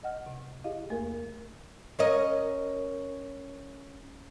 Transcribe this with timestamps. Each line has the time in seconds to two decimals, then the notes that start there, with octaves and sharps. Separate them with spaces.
0.03 D2 D#5 F#5 F6
0.26 C3
0.64 E4 G4 G#4 D#5 F5
0.90 E2 A3 A#3 A#4
1.99 C#4 A#4 D#5